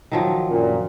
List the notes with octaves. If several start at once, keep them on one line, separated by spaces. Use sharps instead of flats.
D#3 F3 F#3
A#1 F#2 A#2